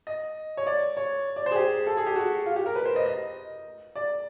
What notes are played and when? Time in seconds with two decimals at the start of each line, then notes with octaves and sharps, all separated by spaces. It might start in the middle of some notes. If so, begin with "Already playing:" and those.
0.07 D#5
0.57 C#5
0.67 D5
0.97 C#5
1.36 D5
1.46 C5
1.51 G#4
1.56 G4
1.87 A4
1.97 G#4
2.06 G4
2.16 F#4
2.46 F4
2.56 G4
2.66 A#4
2.76 B4
2.85 C5
2.96 D#5
3.06 D#5
3.95 D5